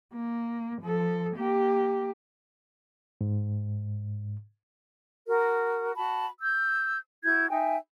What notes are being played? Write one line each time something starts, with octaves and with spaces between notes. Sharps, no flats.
A#3
F3 A4
A#3 G4
G#2
F#4 A#4
F#4 A5 B5
E6 G6
E4 F#4 G6 G#6
D#4 E5 G5 G#5